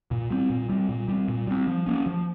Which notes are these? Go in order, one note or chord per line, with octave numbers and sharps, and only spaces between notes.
A#2
G3 C4
A#2
G3 C4
A#2
G3 C4
A#2
G3 C4
F3
A#3 C#4
F3